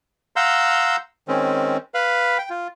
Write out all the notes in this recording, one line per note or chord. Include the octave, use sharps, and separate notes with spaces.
F5 F#5 A#5 C6 E6 G6
D#3 G#3 C4 C#4
B4 F5 B5
G5
F4